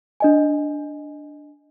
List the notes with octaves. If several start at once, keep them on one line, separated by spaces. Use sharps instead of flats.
D4 D#5 G#5